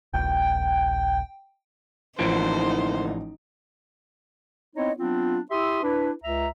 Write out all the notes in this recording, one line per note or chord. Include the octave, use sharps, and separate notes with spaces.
D#1 A#1 G5
A1 D3 E3 F3 A#3 D#4 C5 D7
B3 C4 D#4 E4 C#5 D#5
F#3 B3 C4 D4 F4
E4 G4 E5 C6 D#6 E6
D4 E4 B4
C#2 E5 A#5